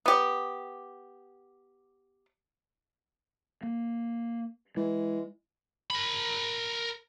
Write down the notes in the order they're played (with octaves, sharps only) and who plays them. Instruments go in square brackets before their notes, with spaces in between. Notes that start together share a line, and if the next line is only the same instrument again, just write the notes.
[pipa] B3 G4
[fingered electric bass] A#3
[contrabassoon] E3 [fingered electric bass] G#3
[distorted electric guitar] A#4 B5